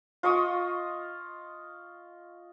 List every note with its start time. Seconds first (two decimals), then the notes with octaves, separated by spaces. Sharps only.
0.23 F4 D#5 C#6 D#6